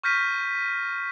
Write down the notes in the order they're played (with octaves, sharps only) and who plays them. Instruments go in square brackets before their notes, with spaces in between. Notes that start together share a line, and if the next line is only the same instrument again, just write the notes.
[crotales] C#6 F6 G6 A#6 B6 D#7